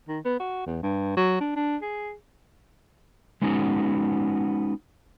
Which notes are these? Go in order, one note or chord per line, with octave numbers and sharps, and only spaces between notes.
D#3
B3
F#4
E2
G2
F#3
D4
D4
G#4
G#3 B3 C#4 D#4 F#4 G#4